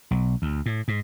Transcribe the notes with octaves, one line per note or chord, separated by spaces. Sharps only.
B1
D2
A2
G#2